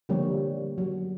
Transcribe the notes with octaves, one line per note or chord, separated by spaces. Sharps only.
D3 F3 G3 A#3 C#5
F#3